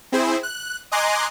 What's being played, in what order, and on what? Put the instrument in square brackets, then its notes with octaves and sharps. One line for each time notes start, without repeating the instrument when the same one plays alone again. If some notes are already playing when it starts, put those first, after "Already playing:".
[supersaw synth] C4 E4 G#4 C5
F#6
D#5 G#5 A#5 C6 D6 F#6